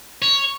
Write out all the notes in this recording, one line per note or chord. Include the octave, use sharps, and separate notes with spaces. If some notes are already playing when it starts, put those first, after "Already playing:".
C#5